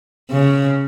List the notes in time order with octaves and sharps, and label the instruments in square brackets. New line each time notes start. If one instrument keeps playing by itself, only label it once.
[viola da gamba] C#3